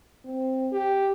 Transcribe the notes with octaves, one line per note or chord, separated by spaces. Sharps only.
C4
G4